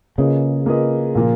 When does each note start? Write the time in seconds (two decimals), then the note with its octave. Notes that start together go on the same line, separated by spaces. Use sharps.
0.18 C#3 A#3 F4 G#4 B4 D#5
0.66 A#3 F4 G#4 B4 D#5
1.15 A#2 F3 A#3 F4